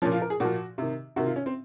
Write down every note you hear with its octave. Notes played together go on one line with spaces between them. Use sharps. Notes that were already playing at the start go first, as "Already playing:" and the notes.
A#2 F3 C#4
F4
A#4
G#4
A#2 F3 F#4
C3 D#3
C3 D#3 F#4
F4
C#4
C4